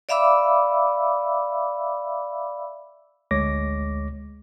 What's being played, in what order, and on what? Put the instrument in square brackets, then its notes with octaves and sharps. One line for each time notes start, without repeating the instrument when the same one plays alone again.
[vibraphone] D5 E5 F5 B5 D6 E6
[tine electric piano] G#1 D2 G#3 C#5 D6 A#6